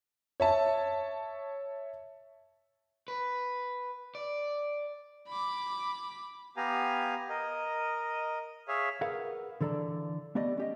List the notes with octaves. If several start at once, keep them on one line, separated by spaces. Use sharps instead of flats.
C#5 E5 A5
B4
D5
B5 D6
B3 G4 F5 G#5 A#5
A#4 D#5
G#4 C#5 E5 F5
G#4 A#4 B4 F5 F#5
D3 E3 A4 D5 A#5
A3 B3 G4 D5 D#5
C#4 G4 D#5